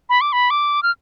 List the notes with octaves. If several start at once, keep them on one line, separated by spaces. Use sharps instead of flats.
B5
D6
B5
D6
F6